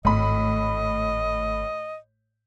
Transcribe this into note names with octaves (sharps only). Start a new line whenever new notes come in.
G#1 A2 D#5 B5